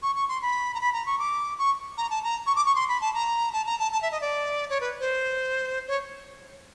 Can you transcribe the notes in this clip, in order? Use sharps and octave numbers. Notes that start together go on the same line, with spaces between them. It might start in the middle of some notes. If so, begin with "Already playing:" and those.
C#6
C#6
C6
B5
A#5
B5
A#5
C#6
D6
C#6
A#5
A5
A#5
C#6
D6
C#6
C6
B5
A5
A#5
A5
A#5
A5
A5
E5
D#5
D5
C#5
B4
C5
C#5